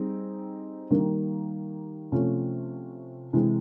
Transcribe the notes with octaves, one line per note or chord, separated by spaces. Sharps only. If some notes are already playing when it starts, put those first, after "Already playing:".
Already playing: G3 C4 D#4 G#4
D#3 G3 A#3
C3 F3 A3 C#4
C3 E3 G#3